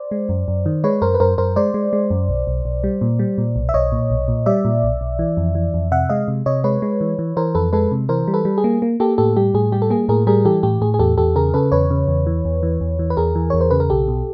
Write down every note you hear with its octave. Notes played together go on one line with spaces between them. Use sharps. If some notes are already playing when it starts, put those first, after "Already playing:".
Already playing: C5 D5
G#3
F#2
F#2
D#3
G#3 B4 C#5
F#2 A#4 C5
B4
F#2 A#4 C5
F#2 A#4 C5
G#3 C5 D5
G#3
G#3
F#2
B1
B1
B1
G3
A#2
G3
A#2
B1
E5
B1 C#5 D#5
A#2
B1
A#2
G3 D5 E5
A#2
B1
B1
E3
F2
E3
F2
C3 E5 F#5
G#3 D#5 F5
C3
C3 C#5 D#5
G#3 B4 C#5
G#3
E3
E3
E3 A#4 C5
F2 A4 B4
G#3 A4 B4
C3
E3 A#4 C5
G3
A4 B4
G3
G#4
A#3
A#3
A#3 G4 A4
A2 G4 A4
G3 G4
A2 G#4
G3 G4
A4
A#3 G#4
A2 G#4 A#4
G3 G#4 A#4
E3 G4 A4
A2 G4
A2 G#4
G#4
E2 G4 A4
E2 G4 A4
C#3 G#4 A#4
C#3 A4 B4
E2 B4 C#5
C#3
E2
E3
E2
E3
E2
E3
B4
E2 G#4 A#4
E3
E2 C#5
C5
C#3 B4
A#4
B1 G4 A4
B2